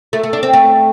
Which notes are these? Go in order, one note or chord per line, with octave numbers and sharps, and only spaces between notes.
A3
A3
D4
C4
A3